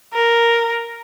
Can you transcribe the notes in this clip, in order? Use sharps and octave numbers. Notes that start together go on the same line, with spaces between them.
A#4